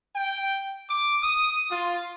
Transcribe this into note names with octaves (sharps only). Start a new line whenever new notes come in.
G5
D6
D#6
F4